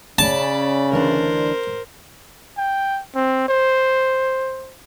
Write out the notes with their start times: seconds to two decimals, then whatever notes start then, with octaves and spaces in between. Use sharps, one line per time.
0.19 C#3 C#4 D5 A5 B5
0.92 D2 E3 D4 A#4 C5
2.57 G5
3.15 C4
3.48 C5